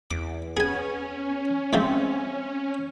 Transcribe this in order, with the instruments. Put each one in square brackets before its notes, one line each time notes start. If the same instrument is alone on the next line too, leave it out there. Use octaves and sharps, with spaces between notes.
[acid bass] E2 [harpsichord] D6
[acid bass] B3 [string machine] C#4 [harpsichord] G#4 G#5
[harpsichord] G#2 F3 A3 [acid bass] C4